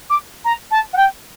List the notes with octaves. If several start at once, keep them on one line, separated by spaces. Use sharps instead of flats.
D6
A#5
A5
F#5
G5